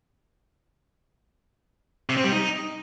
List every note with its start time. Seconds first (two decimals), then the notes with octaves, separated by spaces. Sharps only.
2.09 C3
2.17 C4
2.24 G3
2.32 D#4